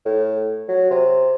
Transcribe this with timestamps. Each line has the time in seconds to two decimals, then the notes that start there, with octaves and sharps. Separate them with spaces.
0.05 A2
0.68 F#3
0.91 C3